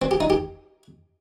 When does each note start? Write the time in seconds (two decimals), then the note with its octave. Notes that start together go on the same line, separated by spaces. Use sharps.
0.02 C4
0.11 G4
0.20 D#4
0.30 G4